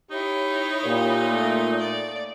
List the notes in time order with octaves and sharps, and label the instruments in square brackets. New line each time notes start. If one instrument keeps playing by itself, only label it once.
[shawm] D#4 [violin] E4 C#5 [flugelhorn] G4
[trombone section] A#2 [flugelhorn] G4
[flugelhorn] A3
[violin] D5